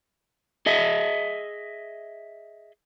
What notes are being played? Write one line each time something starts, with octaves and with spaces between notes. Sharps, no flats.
G#4 D#5 E5